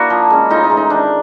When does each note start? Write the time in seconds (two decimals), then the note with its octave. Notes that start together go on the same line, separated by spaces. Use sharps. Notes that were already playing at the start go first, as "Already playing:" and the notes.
Already playing: A#3 D4 E4 F#4
0.10 F3
0.30 G#3 C#4
0.50 A2 D#4 F4
0.64 D#4
0.70 E3 G#3
0.77 D#4
0.90 D#3 D4